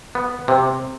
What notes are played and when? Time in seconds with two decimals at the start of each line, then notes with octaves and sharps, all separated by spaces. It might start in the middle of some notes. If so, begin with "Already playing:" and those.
0.15 B3
0.48 C3